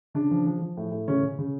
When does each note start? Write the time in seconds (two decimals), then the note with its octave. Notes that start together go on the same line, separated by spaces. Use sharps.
0.14 C#3 D4
0.31 F3
0.46 F3
0.61 F3
0.77 A2
0.92 A2
1.08 C#3 C#4
1.23 C#3
1.38 C#3